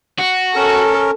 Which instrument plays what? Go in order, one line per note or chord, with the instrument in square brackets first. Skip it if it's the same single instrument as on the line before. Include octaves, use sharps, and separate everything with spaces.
[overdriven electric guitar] F#4
[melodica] C#4 A#4 [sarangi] A4